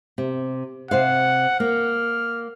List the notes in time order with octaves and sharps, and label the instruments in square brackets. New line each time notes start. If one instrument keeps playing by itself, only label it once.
[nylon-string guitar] C3
[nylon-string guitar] C3 C5 F5 [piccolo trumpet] F#5
[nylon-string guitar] A#3 [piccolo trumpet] F6